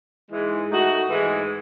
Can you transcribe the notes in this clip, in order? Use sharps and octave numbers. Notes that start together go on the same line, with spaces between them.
G#2 E3 G#3
D#3 A3 D#4 F#4
G#2 E3 G#3